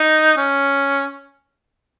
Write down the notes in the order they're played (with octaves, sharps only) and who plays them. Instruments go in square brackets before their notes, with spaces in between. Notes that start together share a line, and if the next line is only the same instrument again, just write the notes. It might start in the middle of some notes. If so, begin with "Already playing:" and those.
Already playing: [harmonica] D#4
C#4